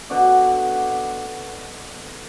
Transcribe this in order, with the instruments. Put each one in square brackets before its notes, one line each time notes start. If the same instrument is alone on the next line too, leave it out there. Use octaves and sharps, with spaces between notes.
[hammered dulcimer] B2 D3 F#4 D5